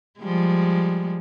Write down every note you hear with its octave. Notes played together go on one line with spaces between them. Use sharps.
F3 G3 G#3